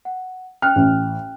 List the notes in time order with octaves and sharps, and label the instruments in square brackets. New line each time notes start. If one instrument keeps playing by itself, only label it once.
[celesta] F#5
[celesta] G5 F#6 [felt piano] F6
[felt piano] A1